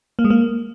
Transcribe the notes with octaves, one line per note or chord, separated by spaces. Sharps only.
A#3
G#3
A#3